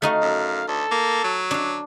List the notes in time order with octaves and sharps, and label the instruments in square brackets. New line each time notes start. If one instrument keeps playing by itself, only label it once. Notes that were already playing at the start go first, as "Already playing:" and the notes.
[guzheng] A3 D#4 F#4 [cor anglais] F5
[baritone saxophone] F#2
[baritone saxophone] D2 [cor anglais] A4
[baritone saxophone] A#3
F#3
[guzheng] D4 F5